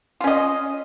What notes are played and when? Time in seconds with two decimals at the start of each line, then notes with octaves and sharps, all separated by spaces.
0.21 F4
0.24 C#4
0.27 D#5